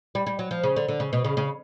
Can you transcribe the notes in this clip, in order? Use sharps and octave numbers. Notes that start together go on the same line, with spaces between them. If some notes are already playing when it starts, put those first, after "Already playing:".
G3
G3
F#3
F3
C#3
D3
D3
C#3
B2
C#3
C#3